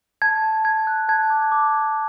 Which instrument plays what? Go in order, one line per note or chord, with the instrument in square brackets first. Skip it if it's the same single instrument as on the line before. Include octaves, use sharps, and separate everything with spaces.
[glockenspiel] A5 G#6
A5
A5 G#6
F#6
A5 G#6
D6
D6
D6